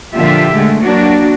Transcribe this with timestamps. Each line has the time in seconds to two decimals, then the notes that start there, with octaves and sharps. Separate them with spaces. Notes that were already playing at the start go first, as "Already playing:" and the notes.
0.14 A#2 D3 F3 F4 G4 E5
0.53 D3 G#3 A3
0.81 F#3 A#3 D4 F#4